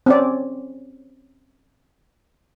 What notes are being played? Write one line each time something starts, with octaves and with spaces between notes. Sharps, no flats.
C4 C#4 D5